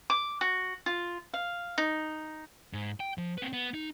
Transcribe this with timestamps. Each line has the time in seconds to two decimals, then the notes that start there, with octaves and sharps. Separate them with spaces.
0.10 D6
0.41 F#4
0.86 F4
1.34 F5
1.78 D#4
2.73 G#2
3.00 G5
3.18 F3
3.38 C4 B4
3.53 B3
3.74 D#4